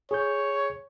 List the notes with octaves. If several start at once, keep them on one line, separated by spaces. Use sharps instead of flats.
G#4 C#5 G6